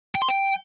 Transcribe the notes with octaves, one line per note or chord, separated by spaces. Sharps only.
G5
C6
G5